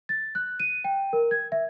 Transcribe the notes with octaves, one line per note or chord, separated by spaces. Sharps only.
A6
F#6
D#7
G5
A#4
G#6
E5